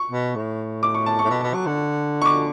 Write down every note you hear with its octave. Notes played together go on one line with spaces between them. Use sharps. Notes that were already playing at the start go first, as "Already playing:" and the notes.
Already playing: C#6
B2
A2
D6
C#6
A5
C#6
A2
B2
B2
F#3
D3
C#6
D6